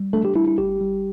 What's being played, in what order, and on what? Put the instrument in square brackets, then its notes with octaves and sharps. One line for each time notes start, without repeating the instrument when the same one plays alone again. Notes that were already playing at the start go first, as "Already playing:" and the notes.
Already playing: [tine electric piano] G3
A3 D4 A4
G4
G3 E4
E4
G1 G4
G3